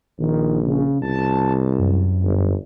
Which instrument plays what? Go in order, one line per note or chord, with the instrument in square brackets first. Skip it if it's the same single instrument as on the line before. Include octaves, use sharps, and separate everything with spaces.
[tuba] A#1 [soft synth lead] D#3
[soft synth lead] C#3
[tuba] C2 [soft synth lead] A5
[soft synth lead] F#2
[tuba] G1